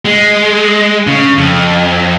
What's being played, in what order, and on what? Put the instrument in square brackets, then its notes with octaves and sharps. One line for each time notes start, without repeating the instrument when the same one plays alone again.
[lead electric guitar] G#3
C#3
F2